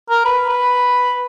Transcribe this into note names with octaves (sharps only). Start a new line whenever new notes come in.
A#4
B4
B4